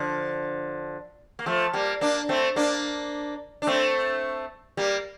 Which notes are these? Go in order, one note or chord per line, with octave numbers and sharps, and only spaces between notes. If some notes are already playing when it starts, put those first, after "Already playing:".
Already playing: D3 F3
A#3
F3 A3
G3 A#3
A#3 D4
A3 C4
A#3 D4
D4
A3 C4
G3 A#3